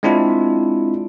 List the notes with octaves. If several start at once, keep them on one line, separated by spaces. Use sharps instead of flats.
G#3 C4 D4 E4 F4